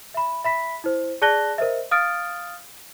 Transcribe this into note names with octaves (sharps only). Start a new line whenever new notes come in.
E5 B5
E5 B5 B6
E4 C5
G#4 D5 A5 F#6 A#6 G7
A#4 C5 D#5 E5
F5 D#6 F6 A6 D7